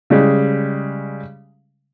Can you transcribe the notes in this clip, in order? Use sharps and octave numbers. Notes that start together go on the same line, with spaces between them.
C#3 G3 G#3